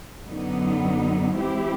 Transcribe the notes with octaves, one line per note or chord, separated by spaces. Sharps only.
F#2 D3 F#3 B3 D#4
E3 G#3 C4 E4 G4